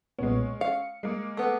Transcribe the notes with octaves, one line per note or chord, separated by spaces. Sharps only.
B1 A#2 G#3 B3 C#4
F5 C#7
G#3 A#3
A3 B3